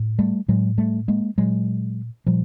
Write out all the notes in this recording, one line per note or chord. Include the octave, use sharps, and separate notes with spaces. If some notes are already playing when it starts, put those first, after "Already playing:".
Already playing: A2
G3 A3
A2 F#3 G#3
G3 A3
G#3 A#3
A#2 F#3 G#3
A#2 F3 G3